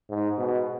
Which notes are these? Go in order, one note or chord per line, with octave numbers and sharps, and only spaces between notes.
G#2
B2